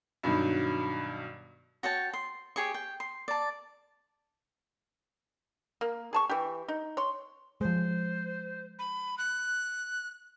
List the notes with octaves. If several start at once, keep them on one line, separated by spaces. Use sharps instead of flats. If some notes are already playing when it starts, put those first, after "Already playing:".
G2 B2 D#3 F#3
F#4 C#5 G5 A5
C6
G4 G#4 C#5 C#6
G5
C6
D5 A5
A#3
G#4 A5 C#6
E3 G4
D#4
C#5 C6
F3 G#3 C5
B5
F#6